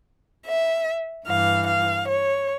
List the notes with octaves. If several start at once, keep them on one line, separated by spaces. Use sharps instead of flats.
E5
G2 E3 F5
F5
C#5